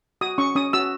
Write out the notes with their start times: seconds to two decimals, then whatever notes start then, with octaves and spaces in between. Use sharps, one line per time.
0.21 F#4 D#6
0.38 C#4 C#6
0.55 C#4 D#6
0.73 F#4 E6